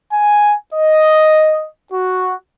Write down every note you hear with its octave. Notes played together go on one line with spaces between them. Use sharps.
G#5
D#5
F#4